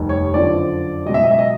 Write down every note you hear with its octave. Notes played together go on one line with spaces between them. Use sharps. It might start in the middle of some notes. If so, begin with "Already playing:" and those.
Already playing: F1 D#2 D#3 G3
C#5
F#1 F2 D3 F3 D5
C#2 B2 F#3 D#5
E5
D#5
E5
D#5